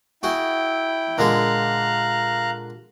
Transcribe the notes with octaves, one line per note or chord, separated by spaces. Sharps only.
E4 F#4 G#4 G5
A#2 D3 G#3 F5 A#5 F#6